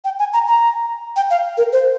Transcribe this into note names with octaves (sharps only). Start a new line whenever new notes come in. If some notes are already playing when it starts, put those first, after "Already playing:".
G5
G#5
A#5
A#5
G5
F5
A#4
C5